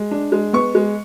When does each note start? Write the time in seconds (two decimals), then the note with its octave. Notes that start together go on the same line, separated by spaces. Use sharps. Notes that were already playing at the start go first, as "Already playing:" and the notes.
Already playing: G#3
0.11 D4
0.32 G#3
0.53 B3 C#6
0.75 G#3